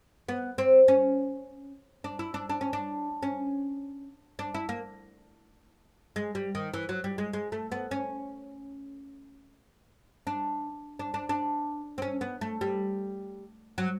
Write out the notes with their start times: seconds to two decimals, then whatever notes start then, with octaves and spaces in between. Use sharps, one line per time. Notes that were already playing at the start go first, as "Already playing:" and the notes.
0.28 B3
0.58 C4
0.88 C#4
2.04 D4
2.19 E4
2.34 D4
2.49 D4
2.61 C#4
2.73 D4
3.23 C#4
4.39 D4
4.54 E4
4.69 A#3
6.16 G#3
6.35 G3
6.55 D#3
6.74 E3
6.89 F#3
7.04 G3
7.18 G#3
7.33 G#3
7.52 A3
7.72 B3
7.91 C#4
10.27 D4
10.99 D4
11.14 D4
11.29 D4
11.98 C4
12.02 C#4
12.21 B3
12.41 A3
12.61 G3
13.78 F#3